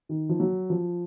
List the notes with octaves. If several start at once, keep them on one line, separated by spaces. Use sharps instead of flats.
D#3
F3
F#3
F3